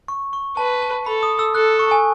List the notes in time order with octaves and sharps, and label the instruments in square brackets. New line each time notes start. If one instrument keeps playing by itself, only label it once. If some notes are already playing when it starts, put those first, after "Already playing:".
[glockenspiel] C#6
C#6
[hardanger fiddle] B4 [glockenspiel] A5
[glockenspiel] A5
[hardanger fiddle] A4 [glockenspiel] B5
[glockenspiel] D#6
E6
[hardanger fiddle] A4 [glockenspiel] F#6
[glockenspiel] C#6
G#5